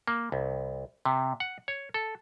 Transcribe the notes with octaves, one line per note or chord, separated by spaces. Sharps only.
A#3
C2
C3
F#5
C#5
A4